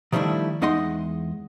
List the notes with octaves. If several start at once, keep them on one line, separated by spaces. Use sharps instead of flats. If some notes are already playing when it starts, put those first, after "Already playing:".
D#3 F3 G3 A3 D4 E4
E2 G#3 D#4 D#5 F#5 C6